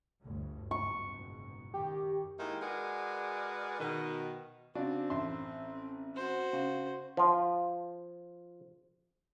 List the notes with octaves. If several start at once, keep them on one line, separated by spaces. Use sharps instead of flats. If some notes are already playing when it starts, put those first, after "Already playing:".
G1 D2 G2
F#1 G#2 B2 C#6
F#2 D#3 G4
D#3 G#3 A#3 D#4 E4
G#3 F#4 G#4 A#4 B4 D5
B2 D#3
C#3 C4 D4 F#4
A1 E5 C6
F#4 C5
C#3
F3 F4